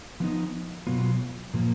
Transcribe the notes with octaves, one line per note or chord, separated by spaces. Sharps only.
F3 B3 D#4
B2 F#3 B3 F4
A#2 F3 A#3